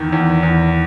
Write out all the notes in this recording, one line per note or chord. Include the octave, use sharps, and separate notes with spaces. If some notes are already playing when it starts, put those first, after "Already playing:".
Already playing: E2 D#3
E2
E2